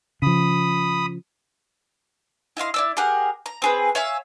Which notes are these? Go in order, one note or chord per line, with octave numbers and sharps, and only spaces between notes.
C#3 F3 B5 D#6
E4 D#5 F5 C6
E4 D5 E6
G4 G#4 A#4 F#5
A#5
C4 G#4 B4
C#5 E5 F5 G#5